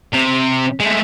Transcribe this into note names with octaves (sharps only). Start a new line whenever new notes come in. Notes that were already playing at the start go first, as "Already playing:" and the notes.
C3
G#3 A3